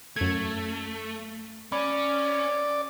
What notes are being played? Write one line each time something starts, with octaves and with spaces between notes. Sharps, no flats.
F#2 A3 G#6
C#4 D5 B5